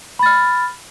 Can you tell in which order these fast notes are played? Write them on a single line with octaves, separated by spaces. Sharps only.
B5 A6 F6